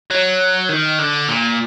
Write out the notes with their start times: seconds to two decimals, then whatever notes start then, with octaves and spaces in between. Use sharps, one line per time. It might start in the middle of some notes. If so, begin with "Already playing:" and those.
0.10 F#3
0.69 D#3
0.99 D3
1.29 A#2